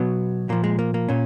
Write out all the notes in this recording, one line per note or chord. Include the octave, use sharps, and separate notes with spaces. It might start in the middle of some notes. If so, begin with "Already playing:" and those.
Already playing: B2 F#3 B3
A#2 F3 A#3
G#3
A#3
A#3
A#2 C#4